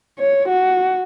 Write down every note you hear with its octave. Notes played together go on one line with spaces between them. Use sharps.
C#5
F#4